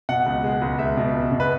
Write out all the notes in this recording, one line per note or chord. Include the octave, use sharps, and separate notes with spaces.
B2 F#5
C#2
G#3
C#2
C#2 E5
B2
C#2
B2
B4